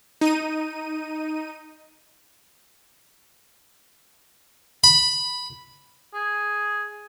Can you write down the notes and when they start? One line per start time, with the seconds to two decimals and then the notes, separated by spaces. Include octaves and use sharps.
0.21 D#4 D#7
4.84 B5
6.14 G#4